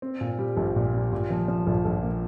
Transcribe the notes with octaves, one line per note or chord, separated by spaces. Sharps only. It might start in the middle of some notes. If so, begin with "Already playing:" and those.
C4
A#2
G3
A#1
A#2
G3
A#2
F3
F3
A#1
A#1
A#3